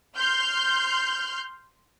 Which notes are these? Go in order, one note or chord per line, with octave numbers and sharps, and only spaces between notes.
C6 F6 G6